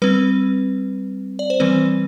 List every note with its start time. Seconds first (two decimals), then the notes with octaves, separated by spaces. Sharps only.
0.02 G3 C4 B4
1.39 D5
1.50 C5
1.60 E3 G3 C4 B4